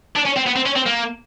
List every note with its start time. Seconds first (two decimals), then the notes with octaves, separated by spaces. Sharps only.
0.16 D4
0.26 C#4
0.37 C4
0.47 B3
0.56 C4
0.66 C#4
0.75 C4
0.86 A#3